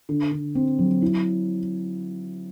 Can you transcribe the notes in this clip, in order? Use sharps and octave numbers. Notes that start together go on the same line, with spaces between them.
D3
D3
C4
F#3
E4